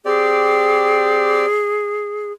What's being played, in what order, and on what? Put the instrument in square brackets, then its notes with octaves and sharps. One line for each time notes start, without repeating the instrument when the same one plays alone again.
[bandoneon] C4 G4 D5 [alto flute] G#4